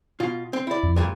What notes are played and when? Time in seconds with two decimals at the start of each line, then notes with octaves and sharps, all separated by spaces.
0.20 B2 F4
0.53 C4
0.67 E4 D5
0.83 F2
0.96 D2 G2 A#2